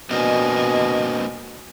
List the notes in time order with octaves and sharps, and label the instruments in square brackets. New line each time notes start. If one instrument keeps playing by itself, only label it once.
[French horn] B2 [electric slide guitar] A#3 C4 D4 [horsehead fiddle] D#5 G#5